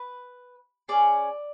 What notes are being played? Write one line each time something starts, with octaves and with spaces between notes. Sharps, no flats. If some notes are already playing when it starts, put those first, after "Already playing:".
Already playing: B4
C#4 G#4 D5